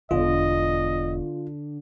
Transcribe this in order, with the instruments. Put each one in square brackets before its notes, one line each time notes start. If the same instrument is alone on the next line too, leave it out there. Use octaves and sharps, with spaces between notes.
[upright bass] E1 E2 [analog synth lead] D3 [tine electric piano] F4 [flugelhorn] D#5